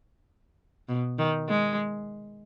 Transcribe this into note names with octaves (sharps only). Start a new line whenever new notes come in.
B2
D#3
G#3